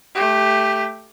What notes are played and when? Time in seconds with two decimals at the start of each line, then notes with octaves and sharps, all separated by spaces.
0.15 A3 G4